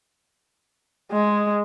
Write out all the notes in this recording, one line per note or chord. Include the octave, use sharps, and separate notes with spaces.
G#3